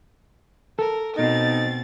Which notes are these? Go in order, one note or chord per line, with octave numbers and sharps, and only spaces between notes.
A4 A#4
B2 C4 D#4 A6